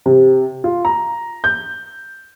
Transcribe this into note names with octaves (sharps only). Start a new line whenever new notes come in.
C3
F4
A#5
G6